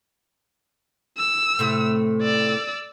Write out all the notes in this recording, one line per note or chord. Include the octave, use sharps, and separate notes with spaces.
E6
A2 C3 A3
D5 E6